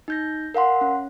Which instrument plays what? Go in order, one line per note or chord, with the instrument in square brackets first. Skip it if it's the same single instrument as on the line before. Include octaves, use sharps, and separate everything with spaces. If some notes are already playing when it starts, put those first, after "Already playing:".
[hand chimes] D#4 G6 A#6
A#4 F5 F#5 C6
C#4